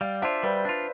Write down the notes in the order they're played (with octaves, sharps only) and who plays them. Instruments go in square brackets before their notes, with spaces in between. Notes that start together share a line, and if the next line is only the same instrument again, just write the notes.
[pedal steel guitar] G3 [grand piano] D5 F5
[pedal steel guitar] D4 F4 [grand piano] C5 E5
[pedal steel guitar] G3 [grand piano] B4 D5
[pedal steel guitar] D4 F4